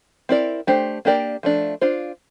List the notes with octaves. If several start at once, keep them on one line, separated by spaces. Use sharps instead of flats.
C4 E4 A#4 D5
A3 D4 G4 C5
A#3 D4 G4 A#4 D5
F3 A3 D4
D4 F4 C5